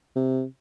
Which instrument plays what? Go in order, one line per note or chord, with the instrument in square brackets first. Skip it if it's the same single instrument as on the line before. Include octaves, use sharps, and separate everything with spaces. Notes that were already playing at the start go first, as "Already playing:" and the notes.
[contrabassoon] C3